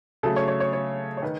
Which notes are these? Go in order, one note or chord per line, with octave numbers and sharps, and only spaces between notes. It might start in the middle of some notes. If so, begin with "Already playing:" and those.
C#3 F#3 A3 A4
C#5
C#5
C#5
C#5
C#5
D#3 B4